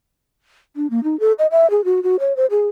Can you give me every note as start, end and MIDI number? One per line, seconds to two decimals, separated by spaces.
0.76 0.89 62
0.90 1.03 58
1.03 1.18 63
1.20 1.32 69
1.39 1.47 75
1.51 1.69 76
1.70 1.84 68
1.84 2.02 66
2.03 2.16 66
2.20 2.36 73
2.36 2.46 72
2.50 2.69 68